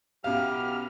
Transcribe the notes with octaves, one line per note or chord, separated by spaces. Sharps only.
B1 F#2 B2 B3 E4 G4 F5 F6